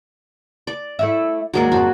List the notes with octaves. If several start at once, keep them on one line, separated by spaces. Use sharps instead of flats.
D5
A3 E4 E5
D#2 F#3 G#3 A#3 D5
F2 C#3 F#4